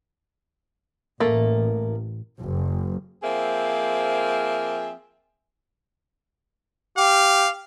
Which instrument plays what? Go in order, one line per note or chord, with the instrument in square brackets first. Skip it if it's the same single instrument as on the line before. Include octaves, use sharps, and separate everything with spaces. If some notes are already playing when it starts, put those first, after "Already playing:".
[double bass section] A1 [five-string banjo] A3 A#3
[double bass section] F#1
[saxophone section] F3 A#3 C4 G#4 E5
[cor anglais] G4 [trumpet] F5